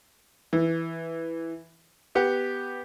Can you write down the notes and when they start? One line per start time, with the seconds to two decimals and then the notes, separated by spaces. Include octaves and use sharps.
0.53 E3
2.15 B3 G4 F#5